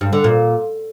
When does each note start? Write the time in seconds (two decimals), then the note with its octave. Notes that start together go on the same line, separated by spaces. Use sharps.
0.01 G2
0.13 D3
0.24 A#2